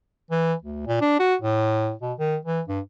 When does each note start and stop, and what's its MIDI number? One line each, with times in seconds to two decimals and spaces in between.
0.31 0.54 52
0.62 0.83 38
0.87 1.00 46
1.01 1.19 62
1.19 1.35 66
1.42 1.92 45
2.02 2.13 47
2.19 2.37 51
2.45 2.61 52
2.68 2.80 43